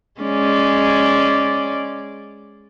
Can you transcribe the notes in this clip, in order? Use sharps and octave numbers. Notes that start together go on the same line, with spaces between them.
G#3 C#4 D5